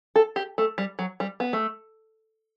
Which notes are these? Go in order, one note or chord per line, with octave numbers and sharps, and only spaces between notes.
A4
G4
A3
G3
F#3
G3
B3
A3